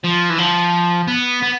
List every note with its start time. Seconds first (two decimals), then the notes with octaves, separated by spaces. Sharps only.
0.04 F3
0.30 E3
0.38 F3
1.07 B3
1.43 B3